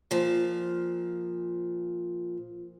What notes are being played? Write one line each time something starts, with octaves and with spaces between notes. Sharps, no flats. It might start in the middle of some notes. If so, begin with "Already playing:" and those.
A#2 F3